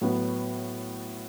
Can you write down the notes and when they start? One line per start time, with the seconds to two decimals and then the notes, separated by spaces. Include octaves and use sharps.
0.01 A2 F#3 B3 F#4